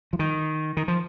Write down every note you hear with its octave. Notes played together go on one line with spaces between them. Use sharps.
F3
D#3
D#3
F3